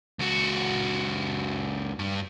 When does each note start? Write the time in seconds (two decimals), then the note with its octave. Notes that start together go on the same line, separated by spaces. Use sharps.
0.20 C#2 F#4
1.99 G2